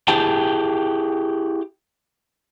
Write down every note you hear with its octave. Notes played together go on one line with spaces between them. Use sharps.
E4 G4 G#4 G5 A5